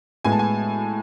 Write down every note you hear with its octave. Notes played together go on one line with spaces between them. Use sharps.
A2 G#3 B3 G#5
A5
G#5